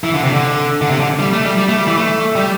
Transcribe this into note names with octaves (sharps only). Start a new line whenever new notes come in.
E3
D3
C3
D3
D3
C3
D3
G3
A3
G3
G3
A3
G3
E3
A3
G3